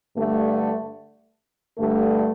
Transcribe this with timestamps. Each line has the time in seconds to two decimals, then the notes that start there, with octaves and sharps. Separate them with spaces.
0.15 G2 D3 A3
1.77 G2 D3 A3